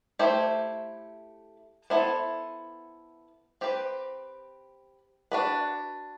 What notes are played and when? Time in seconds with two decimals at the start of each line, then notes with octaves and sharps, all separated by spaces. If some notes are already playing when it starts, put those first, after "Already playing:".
0.19 A3 E4 G4 C5
1.90 B3 E4 A4 C5
3.61 C4 G4 B4
5.32 D4 F#4 B4